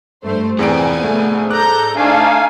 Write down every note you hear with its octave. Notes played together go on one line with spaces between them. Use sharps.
G2 A3 C5
E2 B3 C4 G#4 C5 D5 G#5 D7
A3
A4 A#5 D6 F#6 G6
A3 D4 D#4 F5 G#5